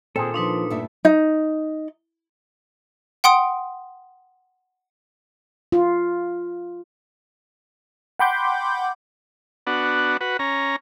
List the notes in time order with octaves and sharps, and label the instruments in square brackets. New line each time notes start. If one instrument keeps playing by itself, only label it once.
[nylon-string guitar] A#2 D#3 [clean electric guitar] C4 G#4 [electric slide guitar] A4
[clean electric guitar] F3 F4 [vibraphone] D4 D#4 B4
[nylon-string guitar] G2 A3 E5 [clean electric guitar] A#2
[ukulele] D#4
[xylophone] F#5 G5 C6 D#6 D7
[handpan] F4
[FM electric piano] F#5 G5 B5 C6 D6 G6
[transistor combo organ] B3 D4 F#4
F#4 B4
C#4 A#5